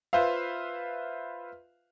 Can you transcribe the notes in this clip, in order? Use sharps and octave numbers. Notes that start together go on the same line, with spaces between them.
F4 B4 C5 E5 F5